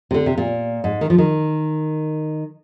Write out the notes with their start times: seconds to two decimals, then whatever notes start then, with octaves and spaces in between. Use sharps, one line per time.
0.11 C3
0.14 D3
0.26 C3
0.38 A#2
0.84 G#2
1.01 D#3
1.10 F3
1.18 D#3